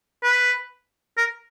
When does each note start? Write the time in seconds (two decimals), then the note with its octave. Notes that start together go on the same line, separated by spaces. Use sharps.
0.23 B4
1.17 A#4